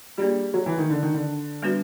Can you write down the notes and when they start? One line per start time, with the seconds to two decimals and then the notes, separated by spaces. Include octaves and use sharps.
0.18 G3 A#3 D4 F4 G#4
0.54 F#3
0.66 E3
0.78 D#3
0.90 D3
1.02 D#3
1.14 D3
1.62 G3 B3 D4 F#4 B4